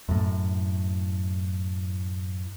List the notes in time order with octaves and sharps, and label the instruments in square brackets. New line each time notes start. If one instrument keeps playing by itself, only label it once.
[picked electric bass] F#2 A2